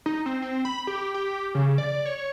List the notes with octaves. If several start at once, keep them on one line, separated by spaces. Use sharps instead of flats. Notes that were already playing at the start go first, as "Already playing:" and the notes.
D#4
C4
C4
B5
G4
G4
C#3
D5
C#5